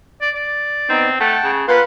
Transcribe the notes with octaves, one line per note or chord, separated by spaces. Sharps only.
D5
D5
B3 C4 D#4
A3 F#5 G5 A5
C#3
A#2 B4 F5 F#5 C6